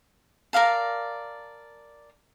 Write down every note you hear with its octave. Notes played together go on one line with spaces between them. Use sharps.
A#4 D5 F5 A5